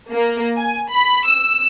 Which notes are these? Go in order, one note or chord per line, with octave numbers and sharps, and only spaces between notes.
A#3
G#5
B5
E6